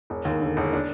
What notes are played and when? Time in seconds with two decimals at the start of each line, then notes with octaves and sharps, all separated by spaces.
0.10 E1
0.25 D#2
0.42 D3
0.57 E1
0.73 D4